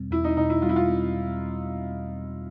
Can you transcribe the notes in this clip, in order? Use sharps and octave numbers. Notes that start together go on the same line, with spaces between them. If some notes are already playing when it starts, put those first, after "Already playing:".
Already playing: E2 B2 G3 C4
E2 E4
D#4
B2 D#4
E4
G3 F4
E4
F4
C4